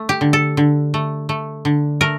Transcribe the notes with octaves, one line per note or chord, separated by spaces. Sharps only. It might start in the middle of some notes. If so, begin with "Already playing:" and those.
Already playing: A3
G4
D3
A4
D3
A3
A3
D3
A3 A#4